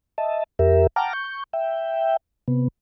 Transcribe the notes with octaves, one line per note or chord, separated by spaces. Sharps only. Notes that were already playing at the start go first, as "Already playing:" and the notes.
D#5 E5 A5
F2 G4 A#4 E5
F#5 G5 A5 A#5 D6 F6
C#6 G6
E5 G5
C3 B3